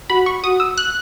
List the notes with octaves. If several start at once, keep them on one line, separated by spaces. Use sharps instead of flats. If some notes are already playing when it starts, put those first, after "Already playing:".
F#4 B5
C#6
F#4 D#6
E6
F#6